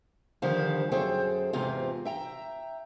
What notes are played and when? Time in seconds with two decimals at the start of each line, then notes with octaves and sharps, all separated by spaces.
0.42 D3 D#3 F3 G3 C5 F5
0.92 F#2 G#4 A4 C5 G5
1.53 E2 G#2 C3 C4 F4
2.05 E5 G5 A#5